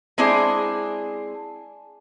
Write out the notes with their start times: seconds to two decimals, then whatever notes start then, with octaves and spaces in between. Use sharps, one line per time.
0.18 G#3 C4 D4 E4 G#4